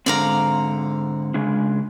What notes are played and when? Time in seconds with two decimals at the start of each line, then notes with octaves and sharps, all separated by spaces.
0.06 G#2 D3 C4 D5 F5 A#5
1.34 C#3 G#3 D4